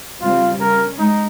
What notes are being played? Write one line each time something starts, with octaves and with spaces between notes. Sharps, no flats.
C#3 G3 C4 F4
C#4 A#4
G#3 D#4